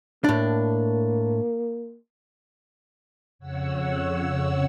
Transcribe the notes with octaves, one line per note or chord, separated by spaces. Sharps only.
A2 A#3 D4
F2 C#3 C#5 F#5 E6